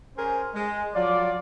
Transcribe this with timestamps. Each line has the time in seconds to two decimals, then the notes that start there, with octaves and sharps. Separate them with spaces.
0.17 C#4 G#4 A#4 C5
0.54 G#3
0.94 F3 F#3 F4 D5